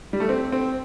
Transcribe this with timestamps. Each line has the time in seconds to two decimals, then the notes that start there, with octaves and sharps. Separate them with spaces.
0.13 G3
0.20 A3
0.29 C4
0.52 C4